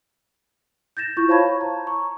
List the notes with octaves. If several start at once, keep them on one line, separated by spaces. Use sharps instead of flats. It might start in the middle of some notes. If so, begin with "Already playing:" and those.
G6 A6 A#6 E7
E4 F4 C#6 G6
C5 C#5 F5 A5 B5 G#6
A#5
C#6